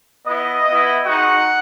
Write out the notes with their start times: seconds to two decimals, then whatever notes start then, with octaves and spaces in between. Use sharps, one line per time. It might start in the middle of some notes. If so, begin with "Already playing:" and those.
0.27 B3 E4 D#5
0.66 B3 E4
1.06 G#3 D#4 F#4 F#5